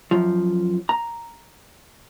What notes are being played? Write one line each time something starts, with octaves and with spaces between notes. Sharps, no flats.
F#2 F3
A#5